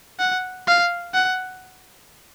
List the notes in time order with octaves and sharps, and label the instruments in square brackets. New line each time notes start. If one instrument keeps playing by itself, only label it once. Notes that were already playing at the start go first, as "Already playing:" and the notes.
[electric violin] F#5
F5
F#5